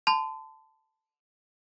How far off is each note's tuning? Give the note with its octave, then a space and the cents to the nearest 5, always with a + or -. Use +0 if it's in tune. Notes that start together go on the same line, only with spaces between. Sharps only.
A5 +0 C6 -40